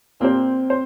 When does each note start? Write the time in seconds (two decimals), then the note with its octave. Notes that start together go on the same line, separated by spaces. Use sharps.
0.20 A#2 A#3 C4 G4 C5
0.70 C5